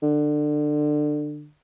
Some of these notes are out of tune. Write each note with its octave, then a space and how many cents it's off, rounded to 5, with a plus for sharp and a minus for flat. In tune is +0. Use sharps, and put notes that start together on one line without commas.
D3 +25